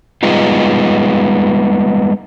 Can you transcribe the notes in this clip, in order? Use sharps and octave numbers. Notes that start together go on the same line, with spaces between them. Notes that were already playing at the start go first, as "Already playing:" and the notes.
G3 G#3 B3 D#4 F4